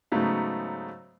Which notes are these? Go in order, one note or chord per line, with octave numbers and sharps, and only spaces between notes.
G#2 C#3 F#3 A3 B3 D#4